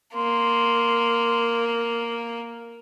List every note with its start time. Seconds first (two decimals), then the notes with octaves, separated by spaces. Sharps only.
0.15 A#3 C6